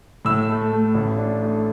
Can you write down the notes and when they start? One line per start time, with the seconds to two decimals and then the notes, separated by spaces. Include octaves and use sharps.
0.25 A2 E6
0.49 A3
0.72 A3
0.95 A1
1.18 D4
1.42 A3